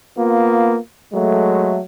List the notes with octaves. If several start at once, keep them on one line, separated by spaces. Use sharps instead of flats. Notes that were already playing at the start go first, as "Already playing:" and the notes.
A#3 B3 F4
F#3 G#3 A3